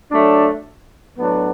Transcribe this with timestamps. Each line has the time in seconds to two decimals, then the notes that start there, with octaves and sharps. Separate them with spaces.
0.11 F#3 A3 D4
1.17 A2 F#3 B3 D4